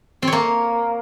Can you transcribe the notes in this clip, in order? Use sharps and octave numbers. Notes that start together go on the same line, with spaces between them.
C4
C#5
A#3